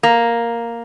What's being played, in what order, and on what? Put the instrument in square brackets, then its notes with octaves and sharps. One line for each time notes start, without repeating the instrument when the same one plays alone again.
[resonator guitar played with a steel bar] A#3